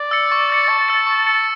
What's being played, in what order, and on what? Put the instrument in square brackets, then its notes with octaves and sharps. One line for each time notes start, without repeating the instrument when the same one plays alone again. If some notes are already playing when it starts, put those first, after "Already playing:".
Already playing: [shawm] D5
[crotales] E6 A6 C#7
C#6
E6 A6 C#7
[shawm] A5 [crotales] C#6
[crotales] E6 A6 C#7
C#6
E6 A6 C#7